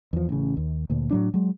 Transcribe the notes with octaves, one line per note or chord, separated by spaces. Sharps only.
E2 F3
A1 C#3
D#2
D2 A#2
A2 F#3 D4
F#3 G#3